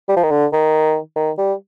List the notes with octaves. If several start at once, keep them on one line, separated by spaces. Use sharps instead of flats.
G3
F3
D#3
D3
D#3
D#3
G3